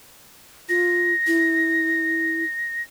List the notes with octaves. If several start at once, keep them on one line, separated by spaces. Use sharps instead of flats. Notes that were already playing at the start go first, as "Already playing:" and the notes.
F4 A#6
E4